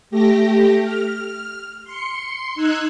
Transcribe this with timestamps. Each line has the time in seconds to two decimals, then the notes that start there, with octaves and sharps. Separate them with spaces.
0.11 A3 G4 A#6
0.83 F6
1.84 C6 C#7
2.55 D#4 E6 F#6 G#6